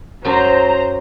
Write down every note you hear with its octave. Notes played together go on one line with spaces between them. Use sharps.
F#2 F#3 C5 A#5